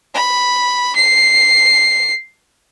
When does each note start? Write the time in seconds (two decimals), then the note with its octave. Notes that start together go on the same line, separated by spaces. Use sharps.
0.14 B5
0.96 C7